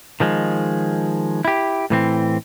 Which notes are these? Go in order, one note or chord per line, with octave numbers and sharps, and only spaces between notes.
D#3 F3 G#3
E4 G4
A2 E3 C4